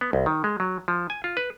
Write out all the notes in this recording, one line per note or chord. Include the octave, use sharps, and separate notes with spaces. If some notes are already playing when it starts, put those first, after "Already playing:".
B3
C2
D#3
G#3
F#3
F3
G#5
F4
B4